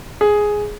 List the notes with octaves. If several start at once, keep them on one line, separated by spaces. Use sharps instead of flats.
G#4